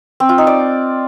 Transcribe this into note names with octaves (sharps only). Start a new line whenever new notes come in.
C4
F4
D#4
D5